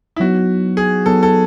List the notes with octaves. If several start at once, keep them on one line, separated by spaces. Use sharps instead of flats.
E4
F#3 B3 D#4 F#4
G#4
F#3 B3 D#4 A4
A4